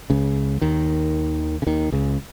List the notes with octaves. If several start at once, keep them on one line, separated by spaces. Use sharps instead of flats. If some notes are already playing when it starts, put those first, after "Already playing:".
C#2 C#3
D#2 D#3
C#3
D#2 D#3
C#2 C#3